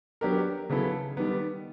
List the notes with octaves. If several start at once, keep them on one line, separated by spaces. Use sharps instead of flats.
F#3 B3 D4 G4 A#4
C#3 F#3 B3 E4 A4
D#3 G3 B3